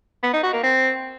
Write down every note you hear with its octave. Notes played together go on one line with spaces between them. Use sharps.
B3
D#4
F#4
A#3
C4